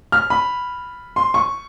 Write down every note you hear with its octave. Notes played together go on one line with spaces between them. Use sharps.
F6
B5
C6
C#6